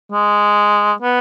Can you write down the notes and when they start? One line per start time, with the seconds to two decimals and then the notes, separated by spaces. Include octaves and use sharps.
0.12 G#3
1.02 B3